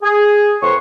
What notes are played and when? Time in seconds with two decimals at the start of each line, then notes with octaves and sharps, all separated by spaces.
0.03 G#4
0.61 F2 B4 C#5 C6 C#6